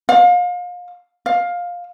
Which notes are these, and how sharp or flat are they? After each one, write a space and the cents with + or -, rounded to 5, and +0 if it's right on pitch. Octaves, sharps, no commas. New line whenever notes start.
F5 +35
F5 +15